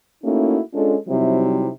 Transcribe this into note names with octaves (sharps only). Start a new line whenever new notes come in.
A3 A#3 C#4 D#4 E4 F#4
G#3 C#4 D4 F4 A4
C3 F#3 G3 C4 D#4 E4